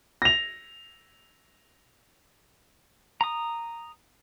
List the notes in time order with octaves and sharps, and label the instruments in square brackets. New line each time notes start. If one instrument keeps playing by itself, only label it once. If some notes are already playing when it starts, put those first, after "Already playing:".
[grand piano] A#6 F7
[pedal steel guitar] A#5 D#6